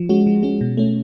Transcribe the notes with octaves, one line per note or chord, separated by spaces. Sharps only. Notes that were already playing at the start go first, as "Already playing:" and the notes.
Already playing: F3
G#3 C#4 F#4
F3
G#3 C#4 F#4
B2
A3 C#4